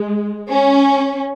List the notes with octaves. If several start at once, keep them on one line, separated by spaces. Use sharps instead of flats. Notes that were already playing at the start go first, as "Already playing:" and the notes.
Already playing: G#3
C#4